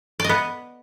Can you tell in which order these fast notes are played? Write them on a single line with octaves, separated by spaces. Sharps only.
D5 D#5 B3